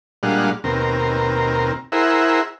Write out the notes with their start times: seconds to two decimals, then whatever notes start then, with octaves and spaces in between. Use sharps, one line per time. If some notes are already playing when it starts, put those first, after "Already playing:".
0.23 A#2 G3 G#3 D4 F5 F#5
0.64 D#2 B2 C4 A#4
1.92 E4 G#4 A#4 C5 E5 F#5